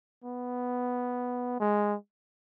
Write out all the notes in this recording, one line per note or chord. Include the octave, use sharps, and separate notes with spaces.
B3
G#3